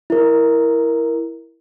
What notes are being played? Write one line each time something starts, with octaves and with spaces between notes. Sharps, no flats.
E4 A#4